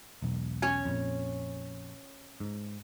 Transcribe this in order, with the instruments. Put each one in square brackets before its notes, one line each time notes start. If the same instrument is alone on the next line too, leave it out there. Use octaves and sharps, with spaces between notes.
[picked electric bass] E1 B1
[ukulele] C#4 C#5 G#5
[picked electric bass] A#1 F2
G#2